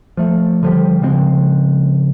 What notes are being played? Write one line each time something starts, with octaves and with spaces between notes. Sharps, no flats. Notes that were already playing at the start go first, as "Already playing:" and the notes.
F3 A3
D3 F3 G3
C#3 F3 G#3 C4